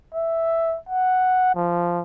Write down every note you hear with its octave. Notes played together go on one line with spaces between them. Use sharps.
E5
F#5
F3